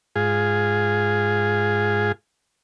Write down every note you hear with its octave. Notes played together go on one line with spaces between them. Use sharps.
G#2 F4 G#4